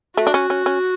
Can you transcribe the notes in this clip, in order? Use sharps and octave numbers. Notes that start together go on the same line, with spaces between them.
A3 F#4
D4
C#4
C#4
C#4